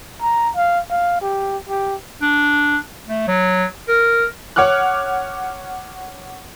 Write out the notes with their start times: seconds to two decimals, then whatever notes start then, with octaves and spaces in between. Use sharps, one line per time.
0.22 A#5
0.56 F5
0.90 F5
1.21 G4
1.69 G4
2.21 D4
3.07 A3
3.28 F#3
3.88 A#4
4.56 C#5 F#5 D6 F6 F#6